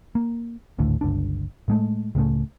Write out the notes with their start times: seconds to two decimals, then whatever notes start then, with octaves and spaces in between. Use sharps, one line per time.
0.15 A#3
0.79 G#1 D2 A2 D3
1.01 G1 C#2 D4
1.68 A2 G#3 A3
2.15 C#2 A2 C#3 A3